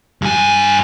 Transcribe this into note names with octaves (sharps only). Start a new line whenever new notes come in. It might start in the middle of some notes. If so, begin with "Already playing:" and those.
G2 G#5